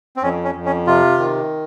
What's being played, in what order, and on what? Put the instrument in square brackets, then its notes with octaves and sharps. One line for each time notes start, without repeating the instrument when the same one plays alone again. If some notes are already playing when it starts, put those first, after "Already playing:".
[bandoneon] C4
F2 C#4
C#4
F2
C#4
C3 F4
D#3